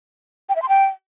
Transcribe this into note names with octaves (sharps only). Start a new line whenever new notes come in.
G5
E5
C6
G5